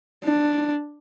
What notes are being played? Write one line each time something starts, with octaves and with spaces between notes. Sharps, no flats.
D4